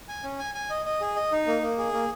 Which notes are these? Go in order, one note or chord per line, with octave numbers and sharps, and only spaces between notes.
G#5
C#4
G#5
G#5
D#5
D#5
G#4
D#5
D#4
A#3
A#3
G#4
A#3